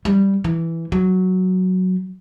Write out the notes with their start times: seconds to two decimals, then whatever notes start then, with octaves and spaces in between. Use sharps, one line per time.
0.05 G3
0.44 E3
0.92 F#3